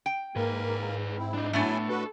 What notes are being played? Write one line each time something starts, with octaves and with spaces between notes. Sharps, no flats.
G5
G#2 A#3 G#4 A#4 B4
C4 E4
D4 D#4
A2 F#3 A3 B3 D4 E4 G#5
A2 F#4 A4 B4